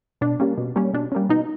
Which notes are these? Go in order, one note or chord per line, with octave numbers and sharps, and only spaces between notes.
B2 D4
G3 A#3 C#4
B2
G3 A#3 C#4
B2 D4
G3 A#3 C#4
B2 D#4